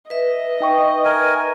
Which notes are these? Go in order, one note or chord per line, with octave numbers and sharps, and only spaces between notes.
B4 D#5 E5
D#4 G5 C#6
A#4 G#5